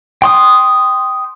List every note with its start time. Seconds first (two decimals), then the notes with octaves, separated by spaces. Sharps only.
0.22 G5 C6 D#6